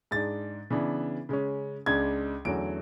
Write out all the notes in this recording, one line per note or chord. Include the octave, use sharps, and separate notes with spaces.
G#2 G#3 D4 A6
C#3 E3 B3 D4
C#3 G#3 C#4
C#2 C#3 G#3 D4 G#6
E2 D3 F#3 A3 C#4 D7